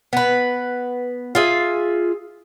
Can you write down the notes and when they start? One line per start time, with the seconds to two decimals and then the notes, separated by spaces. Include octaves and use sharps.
0.13 B3 B4
1.35 F4 G#4 E5